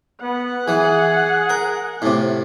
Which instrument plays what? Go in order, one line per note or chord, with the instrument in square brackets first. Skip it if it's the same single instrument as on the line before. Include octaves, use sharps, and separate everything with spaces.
[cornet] B3 [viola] F#5
[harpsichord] E3 [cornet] G#4
[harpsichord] A#4
A2 C3